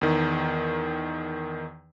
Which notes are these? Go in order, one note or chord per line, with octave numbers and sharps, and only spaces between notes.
E2 D#3